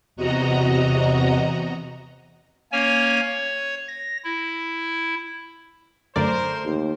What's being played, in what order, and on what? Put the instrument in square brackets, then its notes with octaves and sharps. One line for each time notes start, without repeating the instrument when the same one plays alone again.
[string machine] E2 C3 F#4 D#5 A#5
[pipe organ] A#3 C#4 C#5 G#5
C#5
A#6
E4
[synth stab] F#2 D3 D5 [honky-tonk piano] A3 [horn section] A#4 C5
[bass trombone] D#2